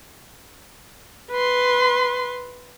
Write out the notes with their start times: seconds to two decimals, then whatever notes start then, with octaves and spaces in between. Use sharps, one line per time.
1.31 B4 C6